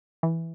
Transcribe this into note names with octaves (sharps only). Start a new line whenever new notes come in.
E3